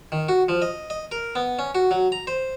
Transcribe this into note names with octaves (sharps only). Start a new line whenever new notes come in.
D#3
F#4
F3
D#5
D#5
A#4
B3
C#4
F#4
F#3
A#5
C5